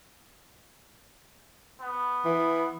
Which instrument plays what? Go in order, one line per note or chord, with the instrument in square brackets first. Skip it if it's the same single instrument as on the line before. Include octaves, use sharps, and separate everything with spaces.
[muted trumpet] B3
[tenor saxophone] E3